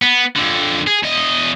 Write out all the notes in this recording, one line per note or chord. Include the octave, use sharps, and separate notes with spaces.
B3
F2 D3
G#4
E2 D#5